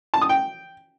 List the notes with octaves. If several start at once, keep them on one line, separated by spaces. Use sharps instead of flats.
A5
D#6
G5